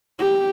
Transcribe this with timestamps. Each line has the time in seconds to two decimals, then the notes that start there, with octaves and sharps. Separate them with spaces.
0.19 G4